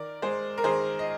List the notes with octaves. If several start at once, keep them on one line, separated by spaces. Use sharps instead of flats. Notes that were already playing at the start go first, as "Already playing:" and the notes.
Already playing: D#3 A#4 D5
G#3 G#4 C5
A#4
D#3 G#4 C5
D#5